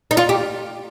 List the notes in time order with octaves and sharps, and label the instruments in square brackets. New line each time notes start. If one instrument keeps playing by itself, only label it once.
[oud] D#4
F4
G4